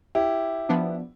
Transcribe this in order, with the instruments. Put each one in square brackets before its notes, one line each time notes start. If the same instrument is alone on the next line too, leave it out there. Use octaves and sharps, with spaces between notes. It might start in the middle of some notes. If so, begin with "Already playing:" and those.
[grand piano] E4 G4
[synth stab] F3 B3 D4